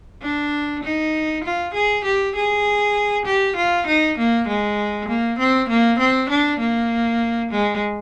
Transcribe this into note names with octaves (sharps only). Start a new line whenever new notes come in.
D4
D#4
F4
G#4
G4
G#4
G4
F4
D#4
A#3
G#3
A#3
C4
A#3
C4
D4
A#3
G#3